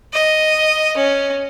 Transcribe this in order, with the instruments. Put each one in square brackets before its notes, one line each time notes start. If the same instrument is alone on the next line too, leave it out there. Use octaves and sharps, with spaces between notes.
[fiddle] D#5
C#4